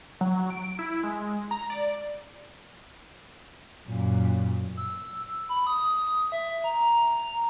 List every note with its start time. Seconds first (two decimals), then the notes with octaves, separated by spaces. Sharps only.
0.21 F#3
0.50 D7
0.79 E4
1.03 G#3
1.51 A#5
1.70 D5
3.88 F#2 A#2
4.77 E6
5.49 B5
5.67 D#6
6.32 E5
6.64 A#5